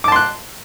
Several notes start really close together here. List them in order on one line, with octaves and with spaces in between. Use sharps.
D6 A5 C6 F#6